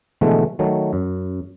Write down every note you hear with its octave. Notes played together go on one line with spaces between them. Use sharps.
B2 D3 E3 F3 G#3 A3
D#3 F#3 A3
F#2